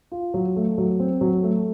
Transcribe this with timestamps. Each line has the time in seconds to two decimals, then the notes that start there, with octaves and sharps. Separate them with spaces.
0.12 F4
0.34 F#3
0.56 A3
0.78 F#3
0.99 C4
1.21 F#3
1.43 A3